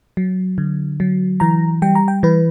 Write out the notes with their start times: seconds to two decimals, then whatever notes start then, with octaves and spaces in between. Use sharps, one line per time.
0.17 F#3
0.58 D3
1.00 F#3
1.40 E3 A#5
1.82 G3 G5
1.95 A#5
2.08 G5
2.23 E3 B4